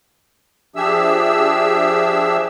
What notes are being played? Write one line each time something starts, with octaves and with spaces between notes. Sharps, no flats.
F3 D4 G4 G#4 E5 E6